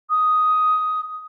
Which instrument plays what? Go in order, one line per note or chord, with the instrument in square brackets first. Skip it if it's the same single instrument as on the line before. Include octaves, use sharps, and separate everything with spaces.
[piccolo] D#6